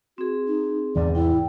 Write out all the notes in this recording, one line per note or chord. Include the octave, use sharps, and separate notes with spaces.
C4 F#4 G#4
D#4
E2 G#2 C3 D5
E4 G5